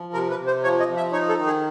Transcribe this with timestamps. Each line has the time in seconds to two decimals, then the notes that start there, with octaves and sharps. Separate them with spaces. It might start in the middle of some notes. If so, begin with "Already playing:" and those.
Already playing: F3
0.13 C3 A#4
0.30 B4
0.38 C3
0.47 C5
0.64 F3 C#5
0.80 D#5
0.88 F3
0.97 E5
1.12 D#4 C#5
1.29 A4
1.37 D#3
1.46 G#4